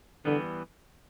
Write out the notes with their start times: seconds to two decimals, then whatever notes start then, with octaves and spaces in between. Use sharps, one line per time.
0.25 D3 E3 G3 B3